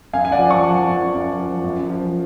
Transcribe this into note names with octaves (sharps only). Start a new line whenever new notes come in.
F#2 F5 G#5
G#5
D5 F#5
F3
A5 C#6
F3
F#5 A5
F#2
F#2
F3
F#2
F3